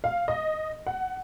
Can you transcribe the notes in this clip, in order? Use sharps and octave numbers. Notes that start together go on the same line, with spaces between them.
F5
D#5
F#5